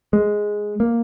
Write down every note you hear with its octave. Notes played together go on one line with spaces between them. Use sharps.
G#3
A#3